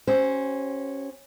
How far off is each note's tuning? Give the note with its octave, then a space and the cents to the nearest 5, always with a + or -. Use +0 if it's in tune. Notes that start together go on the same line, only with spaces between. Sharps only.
C#4 -10 G4 -45 C5 +0